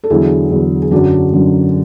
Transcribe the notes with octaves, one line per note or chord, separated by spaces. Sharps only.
A4
E2 D3 F#3 E4 G#4
E2 D3 F#3
G#4
F#2 D3 F#3 D4 F#4
F#2 D3 F#3